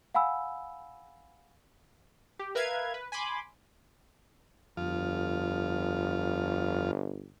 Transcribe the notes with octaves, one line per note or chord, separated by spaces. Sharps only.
F5 F#5 G#5 B5 E6
G4
A#4 B4 E5 F5 F6 G#6
B4
G#5 B5 C6 D6
G1 F2 F4